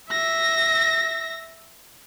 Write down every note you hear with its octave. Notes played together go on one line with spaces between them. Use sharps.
E5 A#6